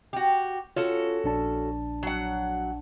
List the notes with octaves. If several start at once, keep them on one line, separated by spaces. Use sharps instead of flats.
F#4 G4
C#4 F4 F#4 A4
A#1 D4 A5
F#3 F#5